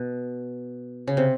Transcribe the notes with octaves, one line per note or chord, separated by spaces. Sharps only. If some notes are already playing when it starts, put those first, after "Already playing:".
Already playing: B2
C#3
C3